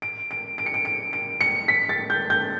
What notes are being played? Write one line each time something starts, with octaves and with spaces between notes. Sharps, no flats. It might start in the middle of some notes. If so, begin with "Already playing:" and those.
D7
D7
D7
C#7
D7
D7
D7
C#7
B6
A6
G6
G6